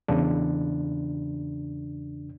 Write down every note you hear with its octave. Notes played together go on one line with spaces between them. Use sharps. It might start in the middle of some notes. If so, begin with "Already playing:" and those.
E2 C#3 D4